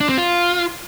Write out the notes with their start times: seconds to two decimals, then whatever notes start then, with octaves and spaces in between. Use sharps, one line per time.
0.01 D4
0.09 C4
0.18 F4